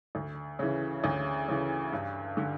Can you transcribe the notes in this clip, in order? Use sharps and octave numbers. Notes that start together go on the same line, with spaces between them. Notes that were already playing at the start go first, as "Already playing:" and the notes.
D2
C#3 E3
D2
C#3 E3
G2
D3